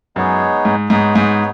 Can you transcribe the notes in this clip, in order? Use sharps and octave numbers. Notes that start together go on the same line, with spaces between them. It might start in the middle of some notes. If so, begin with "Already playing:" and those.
F#2 G#3 B3 D#4 G#4 C#5
G#2
G#2 G#3 B3 D#4 G#4 C#5
G#2